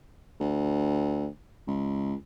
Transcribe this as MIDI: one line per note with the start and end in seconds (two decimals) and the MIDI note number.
0.40 1.27 38
1.68 2.15 37